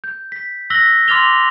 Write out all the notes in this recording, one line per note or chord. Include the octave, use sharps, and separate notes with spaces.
G6
B6
E6 F#6 A#6 B6 F#7 G7
C6 D6 F6 A6 F7 G7